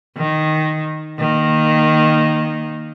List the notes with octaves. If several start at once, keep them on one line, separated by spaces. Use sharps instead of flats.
D#3
D#3 A#3